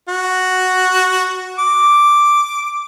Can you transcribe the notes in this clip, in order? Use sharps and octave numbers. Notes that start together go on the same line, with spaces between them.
F#4
D6